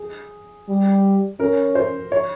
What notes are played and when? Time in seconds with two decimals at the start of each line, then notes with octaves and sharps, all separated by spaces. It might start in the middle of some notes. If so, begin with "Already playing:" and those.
Already playing: G#4
0.69 G3
1.39 C#4 A#4
1.75 C5
2.12 C#5